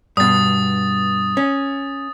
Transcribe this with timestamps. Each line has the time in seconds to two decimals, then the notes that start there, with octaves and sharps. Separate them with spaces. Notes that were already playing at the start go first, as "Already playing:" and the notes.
0.17 G2 B2 D#6 A6
1.37 C#4